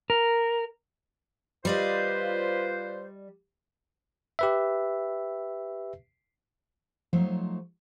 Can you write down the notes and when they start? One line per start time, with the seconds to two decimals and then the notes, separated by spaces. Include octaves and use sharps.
0.10 A#4
1.65 G3 F4 B4 C5 D5 D#5
4.39 G4 B4 E5
7.13 F3 F#3 A3 D#4 C5 C#5